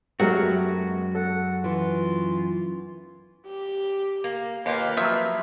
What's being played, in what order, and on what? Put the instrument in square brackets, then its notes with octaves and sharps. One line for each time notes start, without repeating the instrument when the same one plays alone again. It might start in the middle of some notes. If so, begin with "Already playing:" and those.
[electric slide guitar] F#2 B3 F#4 [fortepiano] F#3 A3 A#4 [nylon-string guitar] G#3 G4
[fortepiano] A4 [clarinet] F#5
[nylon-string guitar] E3 [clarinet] F4
[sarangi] G4
[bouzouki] A#3
[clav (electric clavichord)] D#2 [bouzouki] A#3 F4 G4 [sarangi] B4
[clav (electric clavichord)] F3 F#3 [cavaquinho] E5